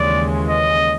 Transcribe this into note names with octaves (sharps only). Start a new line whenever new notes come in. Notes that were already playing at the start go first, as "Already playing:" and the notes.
Already playing: D#2 C#3 E3 G#3 C#4 D5
D#5